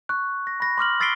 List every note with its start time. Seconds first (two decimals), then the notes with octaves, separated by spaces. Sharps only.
0.09 C#6 F#6
0.47 A#6
0.60 B5 A#6
0.78 C6 D6 F6 F#7
1.00 E6 A6 B6 C7 D7 G7